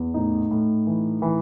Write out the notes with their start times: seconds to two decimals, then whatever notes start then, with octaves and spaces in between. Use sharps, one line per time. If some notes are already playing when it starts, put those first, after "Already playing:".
Already playing: E2
0.14 A2 D#4
0.51 A2
0.87 E3
1.22 E3